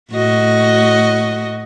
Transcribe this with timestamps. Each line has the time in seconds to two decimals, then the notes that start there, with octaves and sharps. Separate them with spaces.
0.11 A2 F#4 D#5